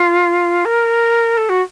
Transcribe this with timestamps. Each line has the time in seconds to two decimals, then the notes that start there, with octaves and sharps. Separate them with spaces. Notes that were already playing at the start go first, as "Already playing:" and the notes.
Already playing: F4
0.65 A#4
1.37 A4
1.49 F#4